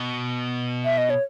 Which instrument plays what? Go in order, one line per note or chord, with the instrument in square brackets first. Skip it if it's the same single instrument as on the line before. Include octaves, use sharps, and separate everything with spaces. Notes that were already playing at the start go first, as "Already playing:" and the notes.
Already playing: [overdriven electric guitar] B2
[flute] E5
D#5
C#5